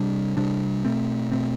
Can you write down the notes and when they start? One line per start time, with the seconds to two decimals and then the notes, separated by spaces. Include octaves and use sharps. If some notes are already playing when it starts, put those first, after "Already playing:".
Already playing: C3 G3 D4
0.37 C3 G3 D4
0.84 B2 A3 C4
1.31 B2 A3 C4